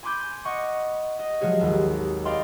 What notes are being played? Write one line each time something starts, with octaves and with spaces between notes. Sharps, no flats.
G#5 B5 C6 D6 G6 G#6
D#5 F#5 C#6
D#5
F3 F#3 G#3 G#4 C#5
G#1 D#2
D5 D#5 F5 G5 B5 C6